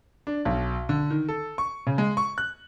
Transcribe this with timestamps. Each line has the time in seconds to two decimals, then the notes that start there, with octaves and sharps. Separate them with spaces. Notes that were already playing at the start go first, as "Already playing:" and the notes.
0.27 D4
0.45 B1
0.89 D3
1.10 D#3
1.28 A4
1.58 C#6
1.87 C#3
1.98 G#3
2.17 C#6
2.38 F#6